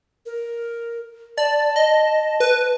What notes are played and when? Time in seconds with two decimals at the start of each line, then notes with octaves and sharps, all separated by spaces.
0.26 A#4
1.38 D5 A5
1.76 D#5
2.40 B4